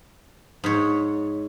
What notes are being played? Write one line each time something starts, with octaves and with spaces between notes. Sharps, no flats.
G#2 C#5